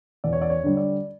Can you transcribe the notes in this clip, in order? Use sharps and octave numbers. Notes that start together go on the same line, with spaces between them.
E2 D5
C#5
D5
C#5
D3 G3
D5